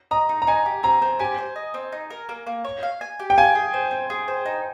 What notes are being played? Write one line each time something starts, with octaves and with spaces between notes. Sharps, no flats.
D#5 A#5
D#4
A#5
D#4 G#5
G4
C4 A#5
C4
G4 G#5
C5
D#5
C4
D#4
A#4
A#3
A#3
C#5
F5
G#5
G4
G5
F4 G#5
G#4
C5
C4
G#4
C5
D#4